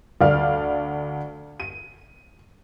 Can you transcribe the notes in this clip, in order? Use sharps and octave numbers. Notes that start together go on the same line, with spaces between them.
D2 D5 F5 F6
D#7